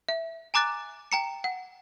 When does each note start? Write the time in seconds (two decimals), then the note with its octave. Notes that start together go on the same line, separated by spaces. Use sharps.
0.08 E5
0.54 G#5 A#5 D6 F#6 A6
1.12 G5 A#5 C#7
1.44 F#5